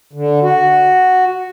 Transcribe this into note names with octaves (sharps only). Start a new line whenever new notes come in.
D3
F#4